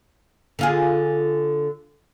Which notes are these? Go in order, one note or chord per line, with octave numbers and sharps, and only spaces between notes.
D3 F4 G#4